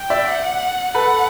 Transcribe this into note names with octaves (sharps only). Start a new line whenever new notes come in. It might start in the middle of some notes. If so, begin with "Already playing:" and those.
Already playing: G5
D5 E5
F#5
A4 B4 F#5